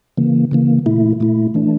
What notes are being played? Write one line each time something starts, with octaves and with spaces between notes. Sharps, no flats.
C#3 E3 A#3
C#3 E3 A#3
A#2 A3 E4
A#2 A3 E4
E3 A3 D4